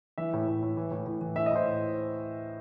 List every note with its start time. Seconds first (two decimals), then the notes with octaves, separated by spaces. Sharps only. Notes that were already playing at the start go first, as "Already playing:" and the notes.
0.18 E3 E5
0.33 A2
0.48 A2
0.62 A2
0.77 E3
0.91 A2
1.06 A2
1.21 E3
1.36 A2 E5
1.46 D#5
1.51 A2 C5